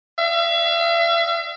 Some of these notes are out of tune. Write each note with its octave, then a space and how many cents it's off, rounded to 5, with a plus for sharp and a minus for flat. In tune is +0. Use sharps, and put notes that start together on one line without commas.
E5 +45